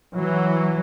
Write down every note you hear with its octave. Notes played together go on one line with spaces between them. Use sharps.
E3 F#3